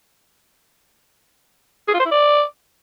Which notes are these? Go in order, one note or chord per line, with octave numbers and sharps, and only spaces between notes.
G#4
F4
C5
E4
D5